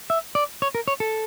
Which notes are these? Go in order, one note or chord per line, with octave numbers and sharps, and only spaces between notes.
E5
D5
C#5
A#4
C#5
A4